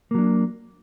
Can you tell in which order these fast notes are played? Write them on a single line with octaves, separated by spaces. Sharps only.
A#3 F#3 D4